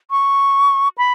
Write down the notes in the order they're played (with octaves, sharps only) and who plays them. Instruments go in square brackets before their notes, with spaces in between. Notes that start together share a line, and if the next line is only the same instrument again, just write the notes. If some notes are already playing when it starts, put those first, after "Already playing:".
[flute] C#6
B5